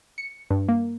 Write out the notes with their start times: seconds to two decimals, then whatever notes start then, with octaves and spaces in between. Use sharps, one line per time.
0.18 C#7
0.50 G2
0.68 A#3